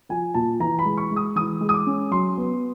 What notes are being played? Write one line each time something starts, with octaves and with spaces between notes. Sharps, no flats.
F3 G#5
A#2 A5
E3 A#5
B5
G#3
C#6
G#3
D#6
E3 D#6
G#3
D#6
D6
C#4
F#3 C6
B3